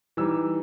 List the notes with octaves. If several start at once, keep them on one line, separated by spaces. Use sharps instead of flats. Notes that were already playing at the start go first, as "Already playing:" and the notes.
E3 G3 D#4 E6